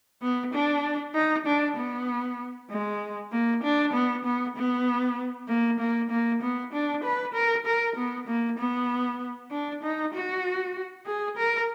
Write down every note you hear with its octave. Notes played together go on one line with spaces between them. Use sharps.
B3
D4
D#4
D4
B3
G#3
A#3
D4
B3
B3
B3
A#3
A#3
A#3
B3
D4
B4
A#4
A#4
B3
A#3
B3
D4
D#4
F#4
G#4
A#4